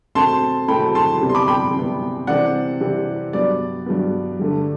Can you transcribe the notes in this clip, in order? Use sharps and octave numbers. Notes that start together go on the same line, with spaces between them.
B2 A3 C4 A5 C6
B2 A3 C4 G5 B5
A5 C6
C3 G3 B3
C6
B5 D6
G5 B5
C3 G3 B3
C3 E3 G3 C4 D5 F#5
C3 E3 G3 C4
G2 F#3 B3 D5
G2 F#3 B3
G2 D3 A3